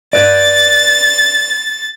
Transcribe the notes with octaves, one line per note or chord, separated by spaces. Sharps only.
B4 D5 A6